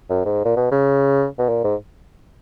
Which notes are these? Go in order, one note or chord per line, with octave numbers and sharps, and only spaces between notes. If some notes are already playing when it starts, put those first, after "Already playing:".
F#2
G#2
A#2
B2
C#3
B2
A#2
G#2